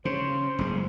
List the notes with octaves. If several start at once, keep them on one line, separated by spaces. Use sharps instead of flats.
C#3 C5
F#1 G#3